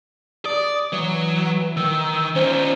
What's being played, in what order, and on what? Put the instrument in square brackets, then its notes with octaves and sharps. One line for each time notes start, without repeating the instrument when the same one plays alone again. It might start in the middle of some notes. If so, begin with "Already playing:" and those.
[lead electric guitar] D5 [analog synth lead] D#6
[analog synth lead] E3 [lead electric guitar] F#3
[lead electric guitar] D#3 [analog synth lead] E6
[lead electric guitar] C#4 D#4 [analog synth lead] C5